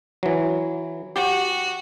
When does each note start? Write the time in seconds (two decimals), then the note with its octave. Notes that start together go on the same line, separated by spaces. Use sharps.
0.23 E3 F#3
1.16 F#4 G4